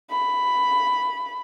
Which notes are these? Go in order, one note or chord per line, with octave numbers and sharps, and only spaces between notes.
B5